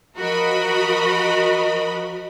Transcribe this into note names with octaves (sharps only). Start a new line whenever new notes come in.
F3 F#4 A#4 D#5 B5